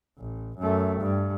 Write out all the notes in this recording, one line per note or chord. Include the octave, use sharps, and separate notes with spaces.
A1
F#2 A3
G2